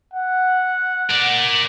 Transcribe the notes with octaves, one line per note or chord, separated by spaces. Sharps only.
F#5
A#4 D5